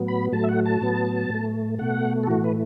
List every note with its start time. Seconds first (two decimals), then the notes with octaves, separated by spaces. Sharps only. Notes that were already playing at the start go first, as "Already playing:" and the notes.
Already playing: A2 F#3 B3
0.08 B5
0.32 A2 F#3 A3 A5
0.43 E5
0.49 F#5
0.66 A5
0.81 A2 F#3 B3
1.30 A2 A3
1.79 B2 A3 F#5
2.23 A4
2.27 A2 E3 A3 F#4
2.44 B4